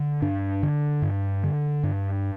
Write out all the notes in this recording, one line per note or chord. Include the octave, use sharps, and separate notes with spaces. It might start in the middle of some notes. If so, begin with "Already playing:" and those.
Already playing: D3
G2 D4
D3
G2
D3
G2